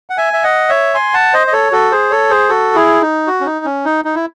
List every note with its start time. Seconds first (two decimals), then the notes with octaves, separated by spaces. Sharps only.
0.10 F#5
0.17 E5 G#5
0.33 E5
0.43 D#5 F#5
0.69 C#5 E5
0.95 G#5 C6
1.14 F#5 A5
1.33 C5 D#5
1.47 D#5
1.52 A4 C#5
1.72 F#4 A4
1.92 G#4 C5
2.10 A4 C#5
2.30 G#4 C5
2.49 F#4 A4
2.75 E4 G#4
3.02 D#4
3.27 F#4
3.41 C#4
3.46 D#4
3.65 C#4
3.85 D#4
4.05 D#4
4.15 E4